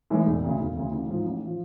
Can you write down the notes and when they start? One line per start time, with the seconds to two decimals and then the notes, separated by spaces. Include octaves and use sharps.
0.10 A2 E3 G#3
0.26 E1
0.43 D2 C#3
0.59 E1
0.76 D2 C#3
0.92 A1
1.09 G#2 F3
1.25 A1
1.46 F3